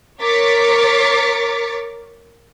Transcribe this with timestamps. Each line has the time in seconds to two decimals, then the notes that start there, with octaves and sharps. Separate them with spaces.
0.20 A#4 C#5 D6 A6 B6 C#7